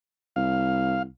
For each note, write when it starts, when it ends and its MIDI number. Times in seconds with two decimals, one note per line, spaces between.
0.36 1.06 36
0.36 1.03 77